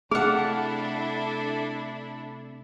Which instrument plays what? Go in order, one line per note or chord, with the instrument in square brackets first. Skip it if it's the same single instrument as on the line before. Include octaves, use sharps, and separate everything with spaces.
[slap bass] C3 A3 [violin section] D4 E4 A4 [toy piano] G#4 [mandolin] F5 F#5